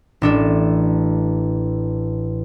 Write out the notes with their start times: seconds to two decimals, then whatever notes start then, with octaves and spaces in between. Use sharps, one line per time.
0.22 A1 D4 A4